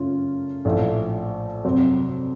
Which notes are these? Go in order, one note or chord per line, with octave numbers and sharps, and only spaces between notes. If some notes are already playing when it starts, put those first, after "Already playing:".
Already playing: F#2 C#3 A3 C#4 F4
A#1 A2 F3 A3
F2 C3 F#3 C4 F#4